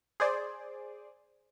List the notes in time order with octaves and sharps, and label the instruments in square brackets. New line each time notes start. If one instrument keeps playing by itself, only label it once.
[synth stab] G#4 C5 D5